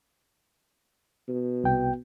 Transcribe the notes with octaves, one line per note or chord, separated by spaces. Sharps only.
B2
C2 G5